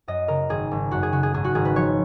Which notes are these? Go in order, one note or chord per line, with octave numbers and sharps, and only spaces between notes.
F#2 D#5
C#3 A#4
G#1 G#4
G#1
F#2 F#4
G#4
C#3 F#4
G#4
G#1 G#4
F#4
G#1 G#4
B4
F3 C#5